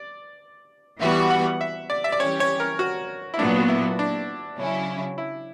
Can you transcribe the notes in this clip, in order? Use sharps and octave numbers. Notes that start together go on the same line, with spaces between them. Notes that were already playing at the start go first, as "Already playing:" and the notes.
Already playing: D5
E3 G3 B3 F#4 E5
F#5
E5
D5
E5
D5
E3 G3 C#4 G4 C#5
C#5
A#4
F#4
E4
A#2 F#3 B3 D4
F#4
E4
D4
C#3 F#3 C#4 E4
E4